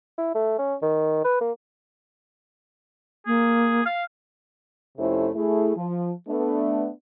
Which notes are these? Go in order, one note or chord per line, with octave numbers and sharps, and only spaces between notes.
E4
A3
C#4
D#3
B4
A#3
A#3 G#4
F5
F2 C3 A3 C#4 E4 C5
A3 E4 G#4
F3
A3 B3 D4